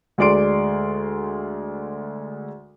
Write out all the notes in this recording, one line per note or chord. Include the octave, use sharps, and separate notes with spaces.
D2 G#3 D5 C6 D7